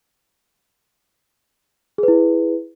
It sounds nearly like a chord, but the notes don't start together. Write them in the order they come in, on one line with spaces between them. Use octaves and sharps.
G#4 B4 E4